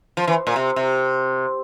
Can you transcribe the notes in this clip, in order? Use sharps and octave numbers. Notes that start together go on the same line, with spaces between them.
F3
E3
A#2
C3
C3